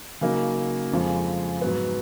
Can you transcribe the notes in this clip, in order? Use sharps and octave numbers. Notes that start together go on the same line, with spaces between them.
C#3 F#3 A#3 D#4
F2 C#3 F3 G#3
G#2 F#3 B3